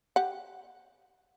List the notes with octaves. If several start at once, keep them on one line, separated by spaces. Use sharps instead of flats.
G4 F#5